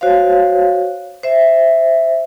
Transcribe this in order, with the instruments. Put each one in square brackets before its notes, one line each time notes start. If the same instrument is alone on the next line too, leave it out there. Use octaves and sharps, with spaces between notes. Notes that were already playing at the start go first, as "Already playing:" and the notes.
[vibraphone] F#4 C5 C#5 F5
C5 E5